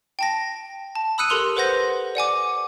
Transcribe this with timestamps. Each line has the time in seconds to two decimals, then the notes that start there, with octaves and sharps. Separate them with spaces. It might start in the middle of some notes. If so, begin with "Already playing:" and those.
0.19 G5 A5 A#6
0.95 A5
1.18 B5 D#6 E6 F#6 C#7 D#7
1.30 G4 A4 A#4 C6 F7
1.57 B4 C5 F#5 G6 A#6
2.15 D5 F#5 G#5 D6